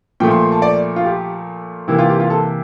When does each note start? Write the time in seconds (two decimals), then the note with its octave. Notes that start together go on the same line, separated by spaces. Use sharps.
0.20 A#2 F3 A3 G5
0.31 C6
0.42 C6
0.52 A5
0.62 D5
0.96 F4
1.05 G4
1.88 C3 E3 A#3 E4
1.98 F4
2.09 G4
2.20 F4
2.30 A4